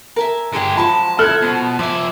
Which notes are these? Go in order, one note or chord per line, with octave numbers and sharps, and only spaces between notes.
A#4 E5 G#5 A5
D3 G#3 G4 G#4 D#5
F3 F#3 G#3 A5 B5
E4 A4 F6 F#6 G#6
B2 C5 D#5
F3 D5 E5 G#5